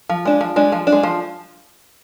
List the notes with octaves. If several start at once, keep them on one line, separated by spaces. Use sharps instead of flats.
F3
G#3 D4
F3
G#3 D4
F3
D4
G#3
F3